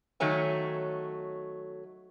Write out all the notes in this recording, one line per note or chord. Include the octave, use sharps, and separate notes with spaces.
D#3 F#3 A3 C#5 G#5